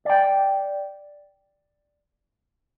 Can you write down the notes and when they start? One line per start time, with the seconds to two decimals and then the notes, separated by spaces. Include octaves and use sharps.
0.05 D5 G5